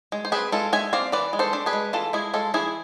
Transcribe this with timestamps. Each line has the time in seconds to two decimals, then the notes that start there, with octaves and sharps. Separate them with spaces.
0.12 G#3
0.25 C5
0.32 C4 G#4 B4
0.52 G#3 F4 A4
0.73 G#3 E5 G#5
0.93 C4 D5 F5
1.12 E3 B4 D5
1.33 G#3
1.39 A4 C5
1.53 D4
1.66 G#4 B4
1.73 G#3
1.93 E3 F4 A4
2.13 G#3 E4 G#4
2.33 G#3 F4 A4
2.54 E3 E4 G#4